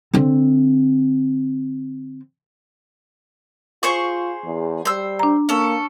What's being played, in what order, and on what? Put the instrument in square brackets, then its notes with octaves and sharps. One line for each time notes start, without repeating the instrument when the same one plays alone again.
[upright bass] D3 C4
[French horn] F4 [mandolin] G#4 C5 C#6
[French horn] E2
[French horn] G3 [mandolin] C5 E6
[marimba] D4 A#5
[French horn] A#3 [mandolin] C#4 A4